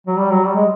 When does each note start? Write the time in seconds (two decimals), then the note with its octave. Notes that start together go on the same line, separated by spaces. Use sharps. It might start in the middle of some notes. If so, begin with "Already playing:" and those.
0.07 F#3
0.18 G3
0.31 F#3
0.46 G3
0.56 G#3